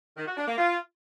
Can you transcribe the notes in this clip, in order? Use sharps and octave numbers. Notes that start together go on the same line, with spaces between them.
D#3
F#4
D4
A#3
F4